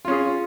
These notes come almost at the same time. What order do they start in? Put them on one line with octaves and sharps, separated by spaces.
F4 C#4 G#4